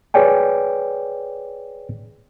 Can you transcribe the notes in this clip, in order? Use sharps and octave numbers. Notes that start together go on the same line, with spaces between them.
G#4 B4 C#5 D5 G5 G#5